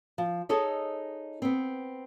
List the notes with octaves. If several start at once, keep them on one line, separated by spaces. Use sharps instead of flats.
F3
D#4 G#4 A4 C#5 D#5
B3 C4